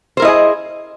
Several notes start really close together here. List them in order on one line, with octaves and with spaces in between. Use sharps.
C5 A#4 E4 D#5 G#4